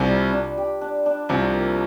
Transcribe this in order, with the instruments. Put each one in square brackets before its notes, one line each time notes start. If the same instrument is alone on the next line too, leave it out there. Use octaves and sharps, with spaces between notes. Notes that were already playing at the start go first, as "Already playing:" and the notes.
Already playing: [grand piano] C2 C3 [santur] D4 F4 C5
[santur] G3
D4
G4
D4
D4
[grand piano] C2 C3 [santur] F3
[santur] A#3